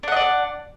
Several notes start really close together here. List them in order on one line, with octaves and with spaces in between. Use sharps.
D4 F#5 D#5 D5